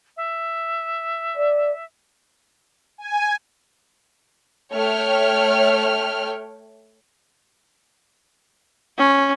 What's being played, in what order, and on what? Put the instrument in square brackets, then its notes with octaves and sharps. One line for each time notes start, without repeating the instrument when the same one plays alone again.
[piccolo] E5
[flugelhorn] D5
[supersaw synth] G#5
[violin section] A3 C#5 G5 F6
[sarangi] C#4